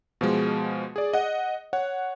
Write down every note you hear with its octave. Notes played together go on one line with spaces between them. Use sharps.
B2 F3 G#3
G#4 D5
D#5 F#5
C#5 F#5